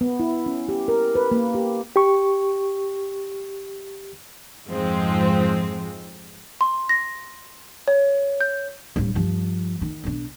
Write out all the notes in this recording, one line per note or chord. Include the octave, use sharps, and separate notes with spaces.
B3
E4
C#4
G4
A#4
B4
A#3
G4
G4 C#6
F2 G#2 F3 G#3 C4
C6
A#6
C#5
G6
D1 G3
G2 F3
D#3
B1 D4